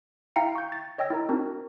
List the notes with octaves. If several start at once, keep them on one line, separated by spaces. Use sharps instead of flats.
E4 E5 F5 G5 A#5 C#7
C#6 G6
A6
C#5 D#5 G5 E6 A#6
E4 A#4 A#5
C4 D4 D#4 F#4 A#4